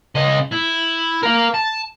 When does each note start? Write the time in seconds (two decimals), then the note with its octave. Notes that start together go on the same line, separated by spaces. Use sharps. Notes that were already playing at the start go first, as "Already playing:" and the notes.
0.15 C#3 D#5
0.51 E4
1.23 A#4 F5
1.54 A5